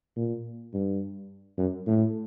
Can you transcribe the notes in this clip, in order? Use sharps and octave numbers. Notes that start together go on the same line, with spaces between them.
A#2
G2
F#2
A2